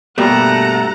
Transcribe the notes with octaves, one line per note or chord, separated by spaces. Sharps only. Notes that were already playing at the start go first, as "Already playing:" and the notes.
G2 B2 G3 A3 A#3 F#5 A#5